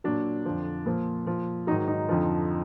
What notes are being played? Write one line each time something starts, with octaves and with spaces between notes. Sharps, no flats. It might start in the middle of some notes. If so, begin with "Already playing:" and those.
A#2 F#3 D4
F2 D3 F3
A#2 F3
A#2 F3
G#2 D#3 F#3 D#4
D#4
F2 D3 F3